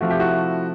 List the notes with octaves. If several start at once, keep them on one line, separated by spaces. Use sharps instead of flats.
C3 F3 A3 F#4
G4
E4 F#4